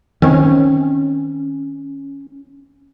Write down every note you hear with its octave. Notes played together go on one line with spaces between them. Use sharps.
D#3 C4 C#4